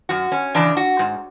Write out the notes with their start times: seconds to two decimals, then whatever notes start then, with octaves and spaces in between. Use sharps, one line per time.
0.09 F#2 F#4
0.32 C#4
0.55 C#3 E3 D4
0.77 F#4
0.99 G#2